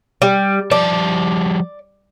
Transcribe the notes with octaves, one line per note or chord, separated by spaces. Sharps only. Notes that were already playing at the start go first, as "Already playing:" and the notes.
G3
F3 G3 D5 A5